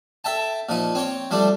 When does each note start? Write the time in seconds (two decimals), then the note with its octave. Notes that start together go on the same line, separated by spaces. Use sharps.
0.24 A4 E5 G5 A5
0.69 A#2 F3 D#4
0.95 C4 C#5 G5
1.31 F3 G3 A3 D4